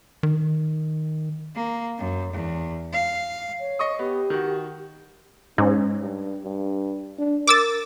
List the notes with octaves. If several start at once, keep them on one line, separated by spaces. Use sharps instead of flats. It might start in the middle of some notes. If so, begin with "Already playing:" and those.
D#3
A#3
F#2
E2
F5
C#5
D#5 C#6 D#6
B3 G4
D#3 F#4
G#2 C#4
G2
G2
D4
A#4 D6 E6 A6